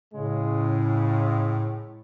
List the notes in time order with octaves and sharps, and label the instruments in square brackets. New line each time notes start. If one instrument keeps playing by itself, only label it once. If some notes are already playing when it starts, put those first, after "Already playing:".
[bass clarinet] A2 [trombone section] C#3 G#3